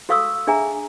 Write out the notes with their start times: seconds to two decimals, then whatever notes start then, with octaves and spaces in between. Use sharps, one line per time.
0.09 F#4 A4 F5 C#6 D#6 E6
0.47 D4 G#4 E5 G#5 A#5